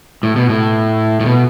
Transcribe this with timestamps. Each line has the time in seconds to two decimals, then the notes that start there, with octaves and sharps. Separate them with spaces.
0.23 A2
0.36 B2
0.49 A2
1.20 A2
1.26 B2